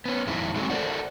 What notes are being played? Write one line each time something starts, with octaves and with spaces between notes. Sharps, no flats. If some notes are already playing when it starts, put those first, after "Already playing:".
B3 C#4
F2 G#3 D#4 E4
F#3 G#3 A3 C4 D#4 F#4
A4 A#4 C5 D5 F#5